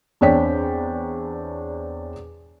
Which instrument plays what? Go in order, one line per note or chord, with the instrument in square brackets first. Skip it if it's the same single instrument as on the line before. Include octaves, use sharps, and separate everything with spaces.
[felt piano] E2 C4 D4 C#5 G5 B6